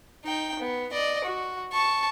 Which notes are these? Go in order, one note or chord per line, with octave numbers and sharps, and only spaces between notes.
D#4 G5
B3
D5 D#5
F#4
A5 C#6